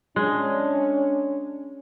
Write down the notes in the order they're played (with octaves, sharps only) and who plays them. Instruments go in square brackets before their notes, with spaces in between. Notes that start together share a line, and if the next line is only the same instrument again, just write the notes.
[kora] G#3 [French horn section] C#4 D4